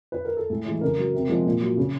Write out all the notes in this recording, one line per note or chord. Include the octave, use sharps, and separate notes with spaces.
B4
A#4
A4
A2 G#4
E3 G#3
A4
C#3 A#4
F#3
C3
F3 G#3
A#2
F#3
C#3